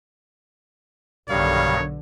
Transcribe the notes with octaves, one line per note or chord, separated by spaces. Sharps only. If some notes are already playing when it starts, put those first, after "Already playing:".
B1 G2 B2 D3 D#3 G3 C#5 F5